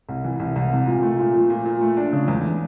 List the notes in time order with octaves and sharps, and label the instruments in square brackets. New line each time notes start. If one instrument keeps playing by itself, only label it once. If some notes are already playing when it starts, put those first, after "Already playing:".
[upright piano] C2
E3
C2
C2
C3
A#2
A3
A#2
F3
A#2
A#2
A3
D4
C#3
E2